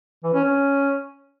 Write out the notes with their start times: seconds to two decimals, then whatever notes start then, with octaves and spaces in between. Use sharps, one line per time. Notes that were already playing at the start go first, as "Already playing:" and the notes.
0.24 E3
0.34 C#4
0.44 C#4